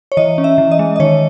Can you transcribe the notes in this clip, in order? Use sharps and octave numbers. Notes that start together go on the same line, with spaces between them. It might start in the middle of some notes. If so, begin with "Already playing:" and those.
C#5
E3 D#5
C#4
E5
E3
D#5
G#3
D#5
D#3 C#5